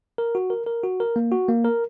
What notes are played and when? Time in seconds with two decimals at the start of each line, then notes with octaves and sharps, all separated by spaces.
0.18 A#4
0.35 F#4
0.50 A#4
0.66 A#4
0.84 F#4
1.00 A#4
1.16 A#3
1.32 F#4
1.49 A#3
1.65 A#4